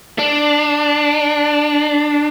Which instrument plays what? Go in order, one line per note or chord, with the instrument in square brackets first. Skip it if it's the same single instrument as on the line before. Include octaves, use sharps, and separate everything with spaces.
[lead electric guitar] D4